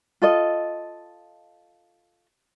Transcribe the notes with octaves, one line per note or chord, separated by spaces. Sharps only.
F4 A4 D#5